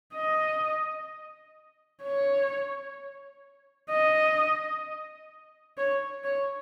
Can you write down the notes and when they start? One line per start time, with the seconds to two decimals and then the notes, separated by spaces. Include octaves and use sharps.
0.15 D#5
2.03 C#5
3.90 D#5
5.77 C#5
6.24 C#5